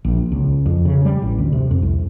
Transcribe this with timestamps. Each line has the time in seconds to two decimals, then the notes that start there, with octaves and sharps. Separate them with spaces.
0.05 A#1
0.32 C#2
0.66 F2
0.85 C#3
1.05 G3
1.22 A1
1.38 D2
1.53 C3
1.71 F2
1.82 C2